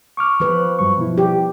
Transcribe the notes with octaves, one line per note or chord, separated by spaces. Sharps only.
C#6 D6 F6
F3 B4
G2 F#3 C#6
B2 F3 E4
G4